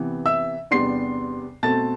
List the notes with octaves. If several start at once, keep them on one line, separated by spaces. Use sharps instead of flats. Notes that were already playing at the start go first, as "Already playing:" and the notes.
Already playing: C3 E3 B3
E5 E6
E2 C3 G3 B3 D4 C6 C7
B2 A3 C4 A5 A6